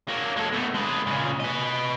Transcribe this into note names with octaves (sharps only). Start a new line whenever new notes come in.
F#3 A#3
G#3 A4
B2 A3
G#3 B4
A#2 C#3
B4 D#5